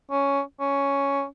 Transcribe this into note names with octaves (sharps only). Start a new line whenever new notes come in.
C#4
C#4